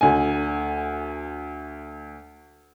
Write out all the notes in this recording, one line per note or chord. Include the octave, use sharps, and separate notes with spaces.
D2 G#5